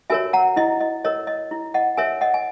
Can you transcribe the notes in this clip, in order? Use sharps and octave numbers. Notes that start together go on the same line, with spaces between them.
F#4 A#4 C#5 E5 G#5
F#5 A#5
E4 D#5
D#5
A#4 C#5 D#5
D#5
E4
D#5 F#5
A#4 C#5 E5 G#5
D#5 F#5
G#5